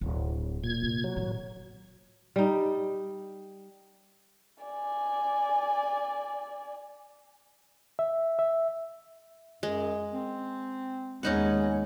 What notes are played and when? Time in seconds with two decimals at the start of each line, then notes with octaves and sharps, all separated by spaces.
0.01 D1 D#4
0.64 A#2 G#6
0.83 C3
1.04 F#3
1.16 A2 D#3
2.36 G3 D#4
4.64 D5 G#5
7.99 E5
8.39 E5
9.63 F#2 G#3
10.13 C4
11.23 D#2 G#3 B3 C#4 D#4 F#5